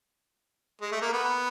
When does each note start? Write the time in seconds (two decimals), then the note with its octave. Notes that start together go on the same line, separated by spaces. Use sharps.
0.81 G#3
0.92 A3
1.02 A#3
1.13 B3